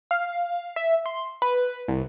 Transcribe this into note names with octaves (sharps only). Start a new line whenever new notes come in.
F5
E5
C6
B4
C2